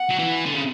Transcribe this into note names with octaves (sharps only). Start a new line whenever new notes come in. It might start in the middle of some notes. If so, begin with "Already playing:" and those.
Already playing: F#5
F#3
E3
D3
C#3